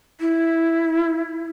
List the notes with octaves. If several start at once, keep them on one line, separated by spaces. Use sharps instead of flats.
E4